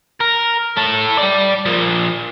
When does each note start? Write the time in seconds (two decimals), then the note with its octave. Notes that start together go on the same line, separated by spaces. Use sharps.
0.21 A#4
0.77 E4 A4
1.19 D5 G5
1.66 F3 A#3